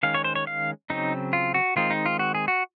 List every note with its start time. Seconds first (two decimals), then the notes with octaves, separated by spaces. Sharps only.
0.03 D#3 G#3 C#4 F5
0.14 C#5
0.24 C5
0.35 C#5
0.47 F5
0.90 C#3 F#3 C4 D#4
1.33 F4
1.54 F#4
1.76 D#3 G#3 C4 D#4 F4
1.90 D#4
2.06 F4
2.19 F#4
2.35 G#4
2.48 F#4